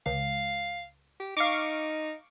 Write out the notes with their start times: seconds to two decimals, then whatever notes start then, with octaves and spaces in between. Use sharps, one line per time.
0.06 C#2 F5
1.20 G4
1.37 D#4 F5 C#6 D6